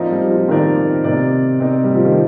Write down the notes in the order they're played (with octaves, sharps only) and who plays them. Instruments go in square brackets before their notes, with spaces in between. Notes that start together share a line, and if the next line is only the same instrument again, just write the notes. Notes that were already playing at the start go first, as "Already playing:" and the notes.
Already playing: [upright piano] F3 [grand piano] C4 D#4 A#4 D5
[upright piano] G3
F3
[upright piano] D#3 [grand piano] C4 D#4 A#4 D5
[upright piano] C3 [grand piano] C4 D#4 A#4 D5
[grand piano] C4 D#4 A#4 D5
[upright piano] G3
F3
D#3